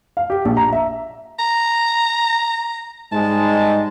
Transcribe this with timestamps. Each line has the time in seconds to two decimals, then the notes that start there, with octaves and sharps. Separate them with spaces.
0.17 F5
0.30 G4
0.45 A#1
0.57 A#5
0.73 E5
1.39 A#5
3.12 G#2 G3 G#3 A5